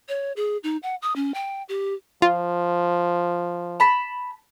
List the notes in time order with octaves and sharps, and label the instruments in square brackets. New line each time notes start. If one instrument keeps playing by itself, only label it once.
[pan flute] C#5
G#4
D#4
F#5
D#6
C#4
G5
G4
[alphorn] F3 [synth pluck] F4
[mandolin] A5 B5